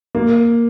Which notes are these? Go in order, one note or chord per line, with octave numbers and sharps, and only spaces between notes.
A#3